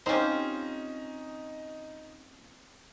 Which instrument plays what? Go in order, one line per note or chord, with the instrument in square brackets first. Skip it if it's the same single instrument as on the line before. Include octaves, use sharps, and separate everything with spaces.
[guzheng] C4 F4 G4 [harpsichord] C#4 C5 [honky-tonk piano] D#4